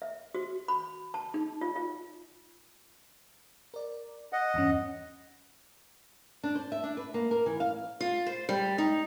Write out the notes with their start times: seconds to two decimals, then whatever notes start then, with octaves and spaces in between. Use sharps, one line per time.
0.02 E5
0.35 F#4
0.68 B5
1.14 A5
1.34 D#4
1.61 F4
1.76 F4
3.74 A#4 D5
4.33 D#5 F#5
4.54 E2 G2 C#4
6.43 D4
6.55 C5
6.72 E5
6.84 D4
6.97 B4
7.14 A#3
7.31 A#4
7.46 E3
7.60 F5
8.00 F4
8.26 C5
8.49 G3
8.78 D#4